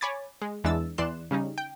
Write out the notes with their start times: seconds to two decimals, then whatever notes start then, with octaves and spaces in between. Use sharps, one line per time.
0.01 C#5 G#5 B5 D6 G#6 A6
0.42 G#3
0.64 E2 E3 G#3 D4 E6 A6
0.98 E2 E3 D5 C6 F#6 E7
1.31 C#3 G3 C#4 D#4
1.58 G5